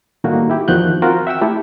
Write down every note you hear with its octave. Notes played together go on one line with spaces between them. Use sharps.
A2 D#3 G3 A3 A#3 F#4
E4 G4
E2 D#3 F3 F#4 F#6 G6
C4 F4 F#4 A#4
E5 F#5 G5 E6
A3 E4 G4 A4